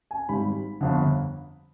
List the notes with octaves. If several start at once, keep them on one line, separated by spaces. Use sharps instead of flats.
G#5
G#1 G#2 G3 B5
G1 F2 D3